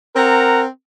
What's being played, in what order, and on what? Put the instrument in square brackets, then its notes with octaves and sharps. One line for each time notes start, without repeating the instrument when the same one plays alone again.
[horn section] C4 A#4 F#5 A#5